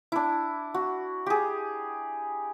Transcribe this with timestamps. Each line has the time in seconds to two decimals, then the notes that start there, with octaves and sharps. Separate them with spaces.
0.12 D4 E4
0.74 F#4
1.26 G4 G#4